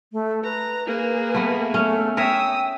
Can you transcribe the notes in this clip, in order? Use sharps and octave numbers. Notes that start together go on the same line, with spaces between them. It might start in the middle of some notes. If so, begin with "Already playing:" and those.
A3
B4 A#5
A#3 G#4 B4
A3 B3
A3 C#4
A#4 C#5 E5 G5 D#6 E6